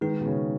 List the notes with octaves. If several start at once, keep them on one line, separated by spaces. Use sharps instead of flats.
D#3 G#3 D#4 G#4 B4
B2
C#3